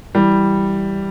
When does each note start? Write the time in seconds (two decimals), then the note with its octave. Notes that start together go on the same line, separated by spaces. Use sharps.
0.15 E3 G3